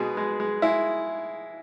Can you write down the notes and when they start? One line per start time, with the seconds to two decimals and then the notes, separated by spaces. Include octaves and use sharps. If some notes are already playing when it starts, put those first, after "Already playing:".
Already playing: B2 G#3 G#4 B4
0.17 G#3
0.40 G#3
0.62 G#3 E4